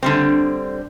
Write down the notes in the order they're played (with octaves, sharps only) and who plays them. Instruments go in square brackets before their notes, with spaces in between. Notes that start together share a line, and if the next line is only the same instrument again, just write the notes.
[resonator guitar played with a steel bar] D3 G3 C4